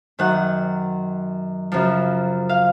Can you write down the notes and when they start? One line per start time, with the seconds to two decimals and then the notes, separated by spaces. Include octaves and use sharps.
0.19 F#2 D#3 F#5
1.72 F#2 C#3 F3
2.49 F5